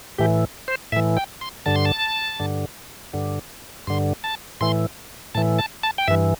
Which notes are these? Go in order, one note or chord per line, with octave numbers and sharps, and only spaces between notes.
A2 E3 G4
C5
A2 E3 E5
G5
C6
G2 D3 A5
C6
A5
G2 D3
G2 D3
G2 D3 C6
A5
A2 E3 C6
A2 E3 A5
A5
A5
G5
G2 E3 E5